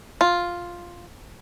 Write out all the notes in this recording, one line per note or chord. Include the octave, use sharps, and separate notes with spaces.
F4